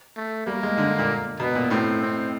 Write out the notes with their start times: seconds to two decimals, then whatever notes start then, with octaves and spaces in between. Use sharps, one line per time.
0.17 A3
0.46 G3 A#3
0.63 G#3
0.78 D3
0.98 A#2
1.40 B2 B3
1.55 A#2
1.71 A2 C4
2.01 C4